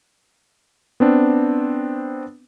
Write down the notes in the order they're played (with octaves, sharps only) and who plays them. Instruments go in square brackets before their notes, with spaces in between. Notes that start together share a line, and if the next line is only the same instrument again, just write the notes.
[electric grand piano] B3 C4 D4